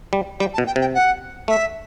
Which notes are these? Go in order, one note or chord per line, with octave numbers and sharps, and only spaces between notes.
G3
G3 G5
A5
B2
G5
C3
G5
F#5
A3 E5